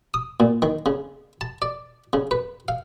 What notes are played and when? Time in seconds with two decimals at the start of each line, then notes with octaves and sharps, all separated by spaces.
0.14 D#6
0.40 A#2
0.62 D#3
0.86 C#3
1.41 A5
1.62 D5
2.13 C#3
2.31 B4
2.68 F5